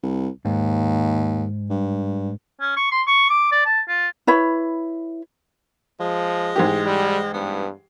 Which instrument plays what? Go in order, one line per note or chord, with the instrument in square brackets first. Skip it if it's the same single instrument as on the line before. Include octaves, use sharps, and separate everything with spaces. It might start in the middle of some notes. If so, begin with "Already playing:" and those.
[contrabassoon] C2
[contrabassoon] D#2 [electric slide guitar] G#2
[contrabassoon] G2
[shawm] C#4
C#6
C6
C#6
D6
D5
A5
F4
[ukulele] E4 B4 C#5 B5
[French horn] F3 [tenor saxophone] G#3
[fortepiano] G#2 E3 G4
[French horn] G3
[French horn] G2 [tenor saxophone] B3